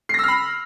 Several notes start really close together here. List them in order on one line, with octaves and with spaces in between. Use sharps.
C7 A#6 E6 F6 B5